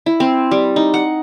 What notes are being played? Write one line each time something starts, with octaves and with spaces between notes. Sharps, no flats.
E4
C4
G3
D#4
F#5